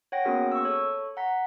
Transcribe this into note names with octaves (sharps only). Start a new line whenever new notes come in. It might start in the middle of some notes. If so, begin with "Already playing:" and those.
C#5 F#5 G5 A#6
A#3 B3 C#4 F#4 G#4 A#4
C#6 E6
A4 C#5
F#5 A#5 B6